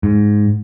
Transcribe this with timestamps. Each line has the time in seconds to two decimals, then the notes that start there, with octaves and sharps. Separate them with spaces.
0.03 G#2